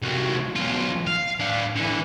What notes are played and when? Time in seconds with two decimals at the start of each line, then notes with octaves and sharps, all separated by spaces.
0.03 C2 F#3
0.56 B1 F4
1.07 F5
1.40 D4 F5
1.76 D3 E3